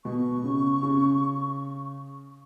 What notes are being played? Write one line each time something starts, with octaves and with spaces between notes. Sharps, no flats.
B2 C#6
C#3
C#3